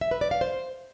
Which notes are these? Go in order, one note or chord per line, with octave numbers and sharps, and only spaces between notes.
E5
B4
D5
F5
C5